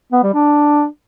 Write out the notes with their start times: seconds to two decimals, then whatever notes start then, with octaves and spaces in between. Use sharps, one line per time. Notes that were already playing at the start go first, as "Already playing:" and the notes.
0.12 B3
0.23 G3
0.34 D4